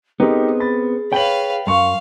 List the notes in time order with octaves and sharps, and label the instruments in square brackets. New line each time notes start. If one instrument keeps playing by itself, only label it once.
[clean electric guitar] B3 C4 [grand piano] D#4 G4 A#4 [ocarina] G#4
[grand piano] B5 A6
[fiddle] B4 F5 [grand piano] C#5 F#7 [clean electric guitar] G5
[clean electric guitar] F#2 [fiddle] F5 [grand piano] C6 C#6